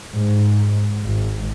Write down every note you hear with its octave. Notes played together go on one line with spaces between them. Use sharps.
G#2
G#1